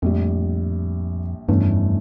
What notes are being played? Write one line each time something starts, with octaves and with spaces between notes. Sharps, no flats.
A#1 F2 A2 G3
F1 E2 G2 E3 A3 C#4